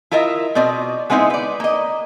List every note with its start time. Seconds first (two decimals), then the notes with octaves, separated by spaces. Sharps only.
0.11 E4 F4 A#4 D#5 E5
0.55 B2 C4 D5 D#5
1.10 G#3 B3 C4 D#4 E4
1.30 B4 D5
1.60 A#3 D#5